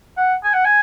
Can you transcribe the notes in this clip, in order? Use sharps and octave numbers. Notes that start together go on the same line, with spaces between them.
F#5
G#5
F#5
G#5